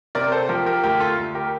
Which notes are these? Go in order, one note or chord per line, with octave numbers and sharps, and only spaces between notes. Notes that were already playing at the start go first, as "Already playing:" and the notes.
C3 A#4 D5
A4 C5
F3 G4 A#4
G4 A#4
D2 G4 A#4
F4 A4
D2
G4 A#4